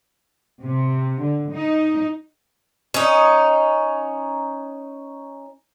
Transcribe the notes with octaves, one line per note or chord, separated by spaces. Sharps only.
C3
D3
D#4
C#4 D#4